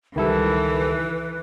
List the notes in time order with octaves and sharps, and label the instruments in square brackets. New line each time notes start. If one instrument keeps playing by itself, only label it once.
[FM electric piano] C#2 G3 [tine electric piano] D#3 E4 A4 [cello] E3 [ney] B4